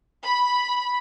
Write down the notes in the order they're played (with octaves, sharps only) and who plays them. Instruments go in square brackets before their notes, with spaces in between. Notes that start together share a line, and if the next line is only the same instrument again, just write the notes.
[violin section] B5